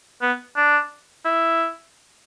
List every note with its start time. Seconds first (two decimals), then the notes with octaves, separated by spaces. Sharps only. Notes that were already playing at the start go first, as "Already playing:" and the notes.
0.22 B3
0.56 D4
1.25 E4